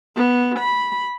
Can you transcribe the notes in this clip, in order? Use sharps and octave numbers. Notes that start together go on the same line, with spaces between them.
B3
B5